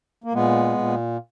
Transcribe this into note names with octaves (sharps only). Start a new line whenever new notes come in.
A#3
A#2 G#3 B3
A#2